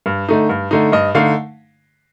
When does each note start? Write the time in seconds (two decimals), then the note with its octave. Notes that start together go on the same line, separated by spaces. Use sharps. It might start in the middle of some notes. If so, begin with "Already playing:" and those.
0.06 G2
0.29 D3 A3 D#4
0.49 G2
0.71 D3 A3 D#4
0.92 G2 D#5
1.15 D3 A3 D#4 F5